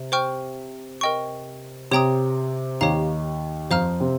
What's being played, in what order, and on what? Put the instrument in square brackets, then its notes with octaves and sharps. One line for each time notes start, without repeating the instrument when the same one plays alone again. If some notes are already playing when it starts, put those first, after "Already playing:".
Already playing: [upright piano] C3
[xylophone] C5 G5 C#6 F6
A#4 D#5 G5 C#6
[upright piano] C3 [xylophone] G4 C#5 G5 A#5 D#6
[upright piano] D#2 D#3 [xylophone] G4 C#5 F5 A#5
[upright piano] F2 F3 [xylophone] C5 F5 A#5 F6
[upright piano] C3 C4